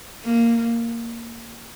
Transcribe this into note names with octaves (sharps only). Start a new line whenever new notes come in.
A#3